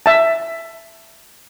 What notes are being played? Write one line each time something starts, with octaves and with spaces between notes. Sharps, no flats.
E5 A5